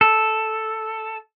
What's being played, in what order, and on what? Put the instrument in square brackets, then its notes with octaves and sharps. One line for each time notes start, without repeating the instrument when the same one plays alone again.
[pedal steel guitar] A4